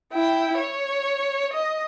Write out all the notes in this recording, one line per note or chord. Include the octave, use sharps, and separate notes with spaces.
E4 G5
C#5
D#5